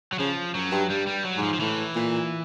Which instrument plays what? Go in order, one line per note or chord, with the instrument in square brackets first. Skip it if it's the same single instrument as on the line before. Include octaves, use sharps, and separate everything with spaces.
[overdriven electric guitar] F#3
[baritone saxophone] C#3 [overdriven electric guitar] F3
[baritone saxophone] F#2 [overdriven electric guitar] F#3
[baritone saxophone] G2
[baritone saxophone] G2 [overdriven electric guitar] G3
[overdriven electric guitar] G3
F#3
[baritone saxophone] G#2
[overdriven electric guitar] F3
F3
[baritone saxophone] A2 [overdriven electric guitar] E3
[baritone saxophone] A#2